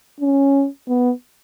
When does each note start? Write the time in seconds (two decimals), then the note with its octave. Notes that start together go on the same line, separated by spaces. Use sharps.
0.21 C#4
0.88 B3